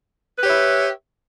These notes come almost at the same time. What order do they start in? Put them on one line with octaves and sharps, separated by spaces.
B4 G4 C#5 E5